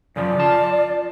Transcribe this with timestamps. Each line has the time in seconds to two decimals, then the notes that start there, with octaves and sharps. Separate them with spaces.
0.16 F#2 C#3 F3 D5
0.39 F4 A5